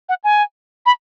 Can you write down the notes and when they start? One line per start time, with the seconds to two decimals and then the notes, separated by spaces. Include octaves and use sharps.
0.09 F#5
0.24 G#5
0.86 B5